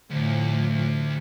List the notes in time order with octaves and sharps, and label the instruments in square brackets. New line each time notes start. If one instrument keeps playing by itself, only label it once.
[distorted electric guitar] D2 [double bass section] A2 F3